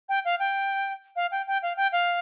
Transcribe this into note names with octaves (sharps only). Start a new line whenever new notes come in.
G5
F5
G5
F5
G5
G5
F5
G5
F5